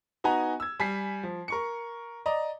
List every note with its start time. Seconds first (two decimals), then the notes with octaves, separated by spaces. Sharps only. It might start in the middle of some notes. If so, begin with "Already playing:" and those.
0.24 B3 D#4 F#4 G#5 A#5
0.60 E6 G#6
0.80 G3 G#5 B6 C7
1.23 F3
1.48 A#4 C#6 C#7
2.26 D5 D#5 A#5